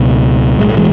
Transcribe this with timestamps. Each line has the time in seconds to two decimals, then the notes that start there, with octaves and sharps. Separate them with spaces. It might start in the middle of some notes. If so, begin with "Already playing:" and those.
Already playing: C#2 B2
0.59 B1 A2 G#3
0.68 A3
0.77 E3 G#3